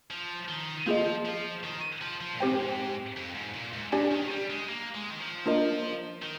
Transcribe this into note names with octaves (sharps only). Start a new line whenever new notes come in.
F3
D#3
F3 A#3 F4 G#4 D#5
F3
D#3
F3
F3
A#2
G#2 C4 G4 C5 G5
F2
G#2
A#2
G#2
G2 D4 G4 D5 G#5
D#3
G3
G#3
A#3
G#3
D#3
F3
A#3 D4 F4 A#4 D#5
D#3